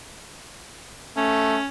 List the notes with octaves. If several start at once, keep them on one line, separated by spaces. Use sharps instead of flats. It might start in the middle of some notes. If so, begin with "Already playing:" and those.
A3 C#4